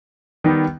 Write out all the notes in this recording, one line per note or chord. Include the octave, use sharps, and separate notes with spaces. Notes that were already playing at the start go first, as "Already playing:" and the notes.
D#3 G3 B3 D#4